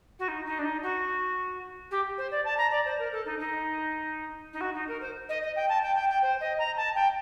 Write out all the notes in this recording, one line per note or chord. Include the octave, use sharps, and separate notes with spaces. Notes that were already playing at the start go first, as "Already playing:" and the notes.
F#4
D#4
D#4
D4
D#4
F#4
G4
C5
D5
A5
A#5
D5
C5
A#4
A4
D#4
D#4
D#4
F#4
D#4
A#4
C5
D#5
D#5
G5
A5
G5
G5
G5
C5
D#5
A#5
A5
G5